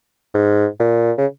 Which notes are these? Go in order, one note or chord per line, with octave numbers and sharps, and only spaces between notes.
G#2
A#2
C#3